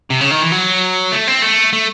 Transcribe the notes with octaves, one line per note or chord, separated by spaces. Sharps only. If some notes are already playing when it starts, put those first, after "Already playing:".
C3
C#3
D#3
E3
F#3
A3
C4
A3
A3